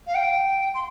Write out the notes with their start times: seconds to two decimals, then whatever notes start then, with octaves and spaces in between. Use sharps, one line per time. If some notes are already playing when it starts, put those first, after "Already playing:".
0.07 F5
0.14 G5
0.74 C6